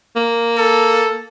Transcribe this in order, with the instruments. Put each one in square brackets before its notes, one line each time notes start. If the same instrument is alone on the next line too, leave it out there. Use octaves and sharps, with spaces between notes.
[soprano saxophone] A#3
[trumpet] A4